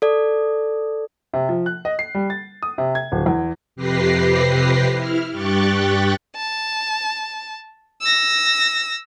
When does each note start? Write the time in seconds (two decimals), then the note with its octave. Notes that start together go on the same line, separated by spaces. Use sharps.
0.02 A4 D5
1.33 C3
1.49 F3
1.66 F#6
1.85 D#5
1.99 C7
2.15 G3
2.30 A6
2.63 D#6
2.78 C3
2.95 G#6
3.12 D1
3.26 E2
3.76 F2 C3 G4 B4 A#6 C7
4.92 E4 F6
5.32 G2 G4 G5 C#6 F#6 A6
6.36 A5
8.02 E6 A#6